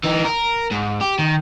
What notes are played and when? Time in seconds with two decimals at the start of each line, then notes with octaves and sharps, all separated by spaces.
0.04 E3 D#4
0.25 A#4
0.71 G#2
1.01 G4
1.19 D#3